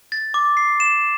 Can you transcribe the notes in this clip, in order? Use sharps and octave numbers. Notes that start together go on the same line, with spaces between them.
A6
D6
C7
E7